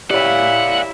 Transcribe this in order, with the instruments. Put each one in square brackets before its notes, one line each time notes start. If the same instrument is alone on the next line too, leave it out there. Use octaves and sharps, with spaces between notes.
[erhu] E4 [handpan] G4 C#5 [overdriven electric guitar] D5 F5 [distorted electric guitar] F#5